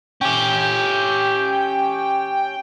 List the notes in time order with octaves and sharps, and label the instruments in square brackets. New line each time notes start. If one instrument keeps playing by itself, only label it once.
[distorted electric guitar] C#4 G4 [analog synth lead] G5